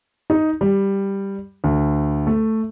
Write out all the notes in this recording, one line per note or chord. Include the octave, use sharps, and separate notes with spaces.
D#4
G3
D2
A3